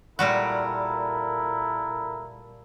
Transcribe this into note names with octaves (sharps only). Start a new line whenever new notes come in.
A#2 G3 E4 F#4 A4 A#4